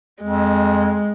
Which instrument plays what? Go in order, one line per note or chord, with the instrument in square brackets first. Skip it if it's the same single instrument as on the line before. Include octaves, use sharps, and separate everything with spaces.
[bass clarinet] F2 [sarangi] G#3